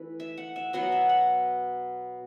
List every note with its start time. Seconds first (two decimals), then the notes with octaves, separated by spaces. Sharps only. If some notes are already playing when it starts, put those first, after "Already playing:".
Already playing: E3 A3 B4
0.20 E5
0.37 F#5
0.56 E5
0.73 B2 F#3 B3 F#5
0.92 E5
1.09 F#5